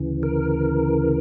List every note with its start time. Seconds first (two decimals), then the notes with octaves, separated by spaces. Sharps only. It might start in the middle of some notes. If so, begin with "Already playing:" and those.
Already playing: D2 C#3 E3
0.23 A#4